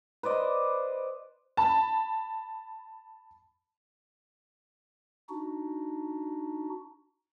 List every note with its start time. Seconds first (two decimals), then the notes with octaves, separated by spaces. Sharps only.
0.23 B4 C5 D5 D#5
1.57 A5 B5
5.29 D4 D#4 F#4